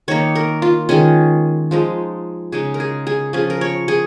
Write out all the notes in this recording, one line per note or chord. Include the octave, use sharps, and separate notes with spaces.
D#3 A#3 D#4 C#5
A#4
F4
D#3 G#3 C#4 G#4
F3 G#3 D#4
C#3 G#3 D#4 G#4
A#4
G#4
G#4
F3 C#4 F4 G#4
A#4
C#5
G#4